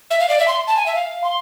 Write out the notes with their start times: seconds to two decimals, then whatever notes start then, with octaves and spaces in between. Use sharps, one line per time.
0.11 E5
0.20 F5
0.29 D5
0.39 E5
0.48 C6
0.67 A5
0.77 G#5
0.86 E5
0.95 F5
1.24 C6